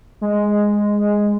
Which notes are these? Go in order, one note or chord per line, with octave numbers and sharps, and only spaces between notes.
G#3